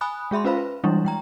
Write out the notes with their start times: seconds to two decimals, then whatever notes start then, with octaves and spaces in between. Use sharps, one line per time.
0.01 G#5 B5 D#6 F#6
0.31 G#3 G#4 E5 B5 C6
0.45 C#4 F4 B4 C5 F5 B5
0.57 B4
0.84 E3 G3 G#3 D4 E4
1.05 G#3 G5 A#5